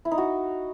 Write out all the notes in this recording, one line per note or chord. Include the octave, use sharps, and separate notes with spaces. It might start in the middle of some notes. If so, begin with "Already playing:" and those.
E4
D#4
F#4